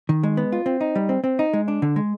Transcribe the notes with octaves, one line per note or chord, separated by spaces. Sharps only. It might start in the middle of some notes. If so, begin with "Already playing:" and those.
D#3
G#3
B3
F4
C4
D#4
G3
C4
C4
D#4
G#3
D4
D3
G#3